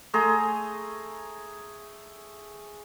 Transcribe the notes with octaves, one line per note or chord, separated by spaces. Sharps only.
A3 G#4 A#5 C6